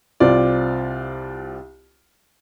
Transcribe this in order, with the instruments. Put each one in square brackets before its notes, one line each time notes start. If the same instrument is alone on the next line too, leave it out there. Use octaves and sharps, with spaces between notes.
[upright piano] C2 C4 F4 D5